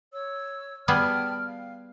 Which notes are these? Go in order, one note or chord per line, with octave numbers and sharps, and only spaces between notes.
C#5 E6
G3 B3 G#4 G5 A5 F6
F5